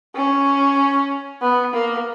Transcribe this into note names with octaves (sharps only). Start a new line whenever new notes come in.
C#4
B3
A#3